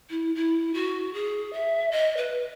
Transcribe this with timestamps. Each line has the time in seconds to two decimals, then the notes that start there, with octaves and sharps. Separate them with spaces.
0.10 E4
0.35 E4
0.74 F#4
1.13 G#4
1.53 E5
1.91 D#5
2.17 B4